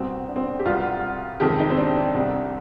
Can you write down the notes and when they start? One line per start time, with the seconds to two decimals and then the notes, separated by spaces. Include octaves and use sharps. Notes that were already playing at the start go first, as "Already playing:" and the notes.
Already playing: C2 B2 B3 C4
0.28 D4
0.36 C4
0.42 D4
0.59 G4
0.65 C2 B2 G3 B3 F4
1.40 F2 C3 D#3 G#3 G4
1.59 D#4
1.70 C4
1.77 D4
1.96 D4
2.14 C2 C3 G3